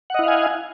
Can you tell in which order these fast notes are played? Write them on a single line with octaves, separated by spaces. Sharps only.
F#5 D#5 E4 F5 G#5